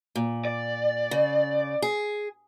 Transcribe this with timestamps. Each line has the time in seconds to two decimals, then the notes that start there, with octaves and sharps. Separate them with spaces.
0.16 A#2
0.45 D5
1.11 C#3
1.82 G#4